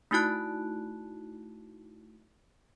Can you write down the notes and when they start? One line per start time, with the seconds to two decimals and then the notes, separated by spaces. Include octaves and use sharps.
0.11 A3 D#4 E4 F#4 A5 F#6